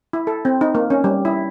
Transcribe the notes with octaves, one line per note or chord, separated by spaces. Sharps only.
E4
A4
C4
D#4
A#3
C#4
G3
E4